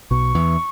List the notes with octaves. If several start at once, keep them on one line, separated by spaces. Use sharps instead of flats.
B1 B2 C#6
E2 E3